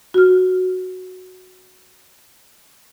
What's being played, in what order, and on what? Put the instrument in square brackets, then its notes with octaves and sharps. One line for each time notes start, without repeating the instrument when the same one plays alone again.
[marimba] F#4 F6